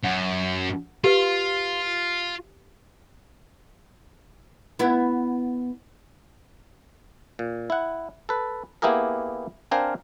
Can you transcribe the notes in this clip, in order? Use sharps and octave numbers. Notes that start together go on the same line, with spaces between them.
F#2 F#5
F4 G4 B4
B3 E4
A#2
E4 F#5
A4 B4
A#3 B3 E4 G4 G#4 A#4
C4 D4 A#4 F5 G5 G#5